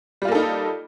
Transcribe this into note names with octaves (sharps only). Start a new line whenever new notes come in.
G3 A#3 D#4 F4 A4